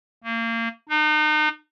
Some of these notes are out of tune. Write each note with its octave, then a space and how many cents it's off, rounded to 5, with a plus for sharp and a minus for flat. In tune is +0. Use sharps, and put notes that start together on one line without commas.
A#3 -30
D#4 -35